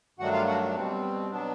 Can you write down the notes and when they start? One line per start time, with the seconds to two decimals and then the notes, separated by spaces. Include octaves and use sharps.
0.18 G2 D#3 F#3 A3 D4 F#4 F#5
0.32 F4 F5
0.47 F#4 F#5
0.75 B2 G3 C4
1.31 B2 F#3 B3 D4